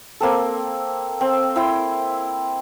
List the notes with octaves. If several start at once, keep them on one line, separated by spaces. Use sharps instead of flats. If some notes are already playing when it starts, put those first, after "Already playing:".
A#3 C4 A4
C4
E4 G5 C6